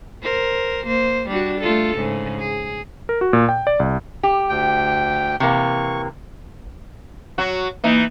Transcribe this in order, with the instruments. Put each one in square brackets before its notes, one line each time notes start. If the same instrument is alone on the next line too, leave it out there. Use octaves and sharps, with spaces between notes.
[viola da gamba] A#4 C5
A#3 C5
G3 D4 F#4
A3 F4 A4
G#2 C#3
G#4
[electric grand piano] A#4
F#4
A#2
G5
D5
C2
[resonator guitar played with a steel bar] G4
[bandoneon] D2 G5
[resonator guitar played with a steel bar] C3 E3 A#3 [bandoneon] C#6
[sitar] F#3 F#4
[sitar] E3 D#4 [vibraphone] A#3